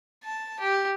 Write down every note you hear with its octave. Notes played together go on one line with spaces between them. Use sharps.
A5
G4